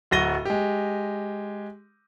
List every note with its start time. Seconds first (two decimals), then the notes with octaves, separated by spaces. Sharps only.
0.11 D1 F#3 F#4 A#6 D#7 G7
0.45 G#3 G4